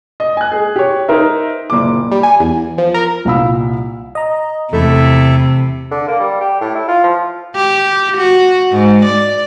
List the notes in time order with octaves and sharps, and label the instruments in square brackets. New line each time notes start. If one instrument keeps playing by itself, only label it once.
[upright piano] D#5
G#5 F#6
G#4
G4 C#5
D#4 A#4 C5 E5
F#1 A#2 D6
[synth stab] G3
G#5
E2
F3
A#4
[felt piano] C2 A#2 F5 B5 E6
[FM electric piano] D#5 A#5
[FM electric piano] E2 [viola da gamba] C3 [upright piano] A3 [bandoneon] E4 A4 E5
[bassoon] D3
A#3
G3
G4
A2
E4
F4
F3
[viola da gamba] G4
F#4
G#2
D5